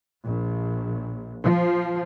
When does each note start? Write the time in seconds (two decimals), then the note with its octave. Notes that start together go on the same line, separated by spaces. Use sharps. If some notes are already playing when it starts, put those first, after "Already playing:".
0.24 A#1
1.42 F3